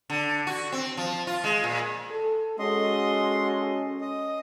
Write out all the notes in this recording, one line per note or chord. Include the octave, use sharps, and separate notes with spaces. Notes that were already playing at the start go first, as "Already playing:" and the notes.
D3
F#4
C4
F3
F4
G#3
A#2
A4
G#3 C#4 F#4 A4 D#5 C6
D#5